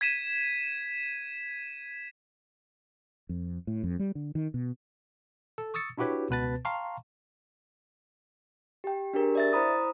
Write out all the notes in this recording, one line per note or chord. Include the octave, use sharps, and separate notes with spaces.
G#6 B6 D#7 E7
F2
A2
F2
G3
D3
D#3
B2
A4
C#6 D#6 E6 A6 C#7
D4 E4 F#4 G4 B4 C#5
C#2 B2 B3 B4 A5 A6
F5 G5 A5 A#5 C6 C#6
G4 G5
D4 G4 G#4 A#4
D5 E5 A6
E4 C5 A#5 B5 D#6